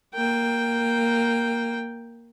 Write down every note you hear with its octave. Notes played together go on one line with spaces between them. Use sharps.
A#3 G5